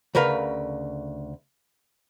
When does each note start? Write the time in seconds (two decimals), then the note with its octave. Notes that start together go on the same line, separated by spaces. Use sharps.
0.15 D2 C#3 A#4 B4 F5